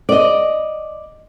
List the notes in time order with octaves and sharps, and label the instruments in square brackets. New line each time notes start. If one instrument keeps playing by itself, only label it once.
[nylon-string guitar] D5 D#5